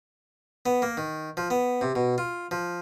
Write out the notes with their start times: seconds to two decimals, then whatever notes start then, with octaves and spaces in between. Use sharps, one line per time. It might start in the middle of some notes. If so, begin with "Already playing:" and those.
0.66 B3
0.82 A#3
0.97 D#3
1.37 F3
1.50 B3
1.81 C3
1.95 B2
2.18 F4
2.51 F3